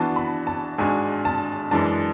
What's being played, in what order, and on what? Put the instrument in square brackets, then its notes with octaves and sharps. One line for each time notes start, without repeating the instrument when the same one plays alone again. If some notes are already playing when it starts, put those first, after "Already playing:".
Already playing: [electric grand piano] E3 B3 D4 F#4 [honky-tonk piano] A5
[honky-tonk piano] B5
A5
[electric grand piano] G#2 G#3 D4 F#4 [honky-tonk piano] G#5
[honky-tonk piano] A5
[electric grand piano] F#2 E3 G#3 D4 [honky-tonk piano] A5